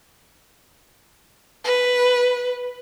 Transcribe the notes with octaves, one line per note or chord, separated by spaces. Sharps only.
B4